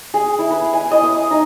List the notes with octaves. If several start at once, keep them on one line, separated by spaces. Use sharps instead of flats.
G#4
E4
B4
G#5
D#5
D#6
D#4